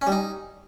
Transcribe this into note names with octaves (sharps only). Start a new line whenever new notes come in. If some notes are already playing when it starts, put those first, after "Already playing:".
C#4
G3
D#4